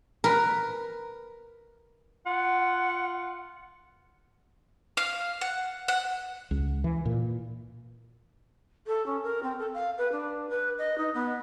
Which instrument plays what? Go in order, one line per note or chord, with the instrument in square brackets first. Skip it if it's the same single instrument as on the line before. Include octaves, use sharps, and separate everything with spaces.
[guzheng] A#4 B4
[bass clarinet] F4 [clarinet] F#5
[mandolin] F5
F#5
F#5
[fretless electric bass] C#2
E3
A#2
[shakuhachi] A4
C#4
A#4
C4
A4
F5
B4
D4
B4
D#5
D#4
B3